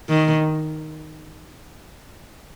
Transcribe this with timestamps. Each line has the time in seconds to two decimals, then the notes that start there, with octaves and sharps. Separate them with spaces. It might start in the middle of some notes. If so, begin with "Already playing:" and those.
0.09 D#3